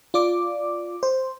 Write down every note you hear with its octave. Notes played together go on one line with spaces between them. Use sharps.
F4 D5 D6
C5